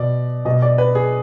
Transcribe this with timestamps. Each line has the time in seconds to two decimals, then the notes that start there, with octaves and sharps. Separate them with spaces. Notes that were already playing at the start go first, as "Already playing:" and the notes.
Already playing: B2 D5
0.45 B2 D#5
0.62 D5
0.78 B4
0.95 G#4